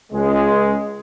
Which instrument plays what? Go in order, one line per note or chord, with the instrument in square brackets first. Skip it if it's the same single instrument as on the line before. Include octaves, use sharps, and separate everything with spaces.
[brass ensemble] C#2 G#3